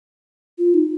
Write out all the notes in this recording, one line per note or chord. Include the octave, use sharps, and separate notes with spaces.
F4
D#4